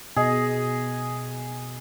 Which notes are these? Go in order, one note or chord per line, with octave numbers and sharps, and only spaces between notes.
B2 G#4 D#5